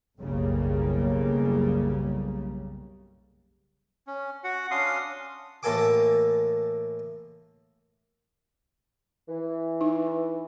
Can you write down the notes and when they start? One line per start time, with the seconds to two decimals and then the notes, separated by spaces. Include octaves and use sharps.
0.19 F#1 B1 C#3 G3 A#3
4.07 C#4
4.44 F#4 F#5
4.71 C#4 D4 F5 C6 D#6
5.63 A1 A2 A#3 A4 G#5 D6
9.28 E3
9.81 D#4